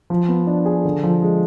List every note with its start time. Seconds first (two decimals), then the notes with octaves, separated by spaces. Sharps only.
0.10 F3
0.29 B3
0.47 D4
0.66 G#4
0.85 D3
1.03 F3
1.22 G#3